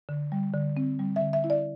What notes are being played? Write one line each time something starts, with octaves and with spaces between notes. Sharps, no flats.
D3
G3
D3
C4
G3
E5
D3
E5
E4
D5